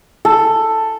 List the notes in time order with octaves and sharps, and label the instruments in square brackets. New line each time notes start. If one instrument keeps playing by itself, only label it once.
[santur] A4